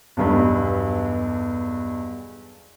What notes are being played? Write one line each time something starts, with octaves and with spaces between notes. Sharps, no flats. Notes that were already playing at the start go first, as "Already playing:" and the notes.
B1 E2 G2